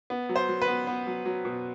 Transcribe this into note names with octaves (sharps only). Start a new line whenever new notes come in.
B3
F#3
C5
F#3
B4
B3
B3
F#3
F#3
B2